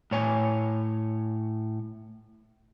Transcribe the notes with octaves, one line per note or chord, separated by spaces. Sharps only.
A2 C#5 G#5